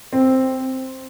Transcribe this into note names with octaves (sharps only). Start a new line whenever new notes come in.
C4